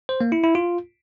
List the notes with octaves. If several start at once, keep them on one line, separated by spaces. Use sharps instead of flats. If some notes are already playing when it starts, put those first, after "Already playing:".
C5
A#3
E4
E4
F4